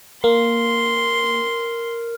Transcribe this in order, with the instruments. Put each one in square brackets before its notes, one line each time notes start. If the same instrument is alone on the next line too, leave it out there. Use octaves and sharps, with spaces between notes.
[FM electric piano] A#3 [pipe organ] A#4 [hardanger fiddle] C6